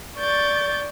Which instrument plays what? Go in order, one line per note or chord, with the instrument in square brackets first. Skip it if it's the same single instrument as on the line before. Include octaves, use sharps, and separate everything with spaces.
[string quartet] D5 C#6 G6 A6